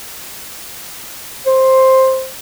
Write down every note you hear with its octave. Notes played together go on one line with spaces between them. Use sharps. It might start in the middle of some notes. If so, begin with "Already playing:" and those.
C5